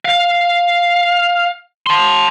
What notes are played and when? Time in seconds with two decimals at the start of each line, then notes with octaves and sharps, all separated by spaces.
0.05 F5
1.87 A5 C6